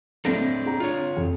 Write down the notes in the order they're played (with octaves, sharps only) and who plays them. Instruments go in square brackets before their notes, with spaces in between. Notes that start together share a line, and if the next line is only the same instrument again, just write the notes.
[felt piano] A3 A#6 [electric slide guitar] C4 D4 A4
[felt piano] G#4 A#5
[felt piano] D4 [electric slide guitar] F4 C#5
[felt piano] F2